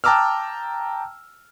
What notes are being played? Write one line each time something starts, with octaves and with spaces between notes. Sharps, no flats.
G5 A5 A#5 D6 E6 F6